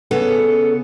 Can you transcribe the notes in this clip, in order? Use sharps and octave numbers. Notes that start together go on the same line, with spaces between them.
C#3 B3 C#4 A4 F#5